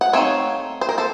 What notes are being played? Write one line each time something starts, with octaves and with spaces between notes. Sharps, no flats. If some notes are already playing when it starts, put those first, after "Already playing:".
F#5
A3 C4 D#4 C#5 F5
C5
A#4
A4 C5